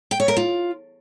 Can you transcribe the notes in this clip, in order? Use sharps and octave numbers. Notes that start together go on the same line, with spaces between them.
G5
C#5
A#4
F4